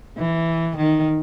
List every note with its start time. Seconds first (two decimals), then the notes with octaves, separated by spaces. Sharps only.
0.18 E3
0.77 D#3